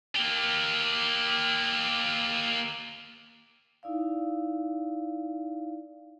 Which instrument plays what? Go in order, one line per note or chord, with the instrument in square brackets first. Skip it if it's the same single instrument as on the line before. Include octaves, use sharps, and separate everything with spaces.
[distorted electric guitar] A#3 G4
[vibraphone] D#4 E4 D5 F5